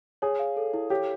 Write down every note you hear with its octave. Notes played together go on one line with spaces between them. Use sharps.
G#4 C#5
F5
A4
E4
G4 C#5